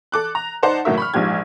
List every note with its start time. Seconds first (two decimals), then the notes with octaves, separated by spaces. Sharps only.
0.12 A4 D6 F#6
0.35 A#5
0.63 D#4 C5 D5 F#5 A5
0.85 F#1 A2 F#4 A#4 E5
0.98 B5 C#6 F6
1.14 A#1 G#2 F3 G4 G#6